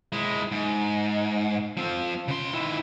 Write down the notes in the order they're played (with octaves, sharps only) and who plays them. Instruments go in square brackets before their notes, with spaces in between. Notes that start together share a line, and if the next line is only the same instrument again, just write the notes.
[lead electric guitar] G#3 E4
G#2
F3 C4
C#3 C6
D#3 E4